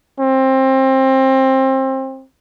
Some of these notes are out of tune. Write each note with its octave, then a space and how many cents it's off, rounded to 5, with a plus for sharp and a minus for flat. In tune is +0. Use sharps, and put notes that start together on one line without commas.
C4 +25